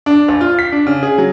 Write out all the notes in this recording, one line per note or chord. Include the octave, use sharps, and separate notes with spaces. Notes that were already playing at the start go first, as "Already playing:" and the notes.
D4
A#1
F4
B6
D4
C#3
G#4
F#3